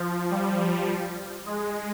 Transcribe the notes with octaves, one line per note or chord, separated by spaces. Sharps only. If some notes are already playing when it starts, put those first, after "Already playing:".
Already playing: F3
G3
G#3